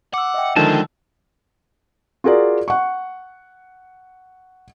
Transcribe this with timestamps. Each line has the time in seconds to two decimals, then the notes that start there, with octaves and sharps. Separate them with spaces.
0.14 F#5 D6 E6
0.34 D#5 E5 G5
0.56 D3 D#3 F3 G#3 A5 E6
2.24 F4 F#4 G#4 A#4 D5
2.68 F#5 C#6